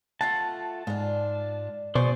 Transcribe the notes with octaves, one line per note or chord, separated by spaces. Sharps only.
A3 F4 F#5 A5
G#2 D4 F4
B2 G#4 C5 D5 C#6